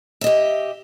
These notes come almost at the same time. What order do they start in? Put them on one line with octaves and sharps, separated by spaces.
E5 D#5 G4